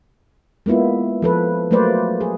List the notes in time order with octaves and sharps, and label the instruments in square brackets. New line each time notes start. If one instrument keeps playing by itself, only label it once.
[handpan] G#3 A#3 B3 E4 F4
F3 A4 B4
F#3 A3 A#3 B4 C5 D5
G#4